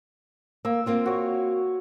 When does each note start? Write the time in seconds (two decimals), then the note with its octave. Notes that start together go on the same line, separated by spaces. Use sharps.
0.65 A#3 E6
0.86 A#3 C4 F4
1.06 F#4 C#5